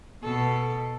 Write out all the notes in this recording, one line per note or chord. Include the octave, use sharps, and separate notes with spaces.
B2 A4